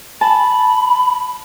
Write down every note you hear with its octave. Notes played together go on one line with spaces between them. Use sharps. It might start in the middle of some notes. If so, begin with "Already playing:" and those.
A5 B5